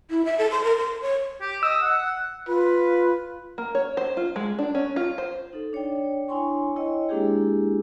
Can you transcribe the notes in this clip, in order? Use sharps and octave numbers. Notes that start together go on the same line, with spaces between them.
E4
E5
A4
C6
A#4
C6
C#5
G4
D#5 E6
F#5
F4 B4
A#3
C#5
C5
F4
G#3
D4
C#4
F4
C5
D#4 A4
D4 C#5 D5 G5
D4 E4 C#5 G#5 C6 C#6
E4 C#5 D#5 G5 C6
G#3 A#3 D4 E4 G4 G#4